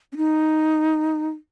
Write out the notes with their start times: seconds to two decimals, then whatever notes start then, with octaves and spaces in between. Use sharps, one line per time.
0.13 C#4
0.17 D#4